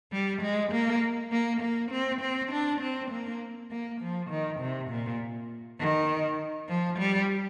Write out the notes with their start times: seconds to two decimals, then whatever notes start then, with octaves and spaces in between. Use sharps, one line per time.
0.12 G3
0.42 G#3
0.72 A#3
1.32 A#3
1.61 A#3
1.91 C4
2.21 C4
2.51 D4
2.81 C4
3.11 A#3
3.71 A#3
4.01 F3
4.30 D#3
4.60 C3
4.90 A#2
5.80 D#3
6.69 F3
6.99 G3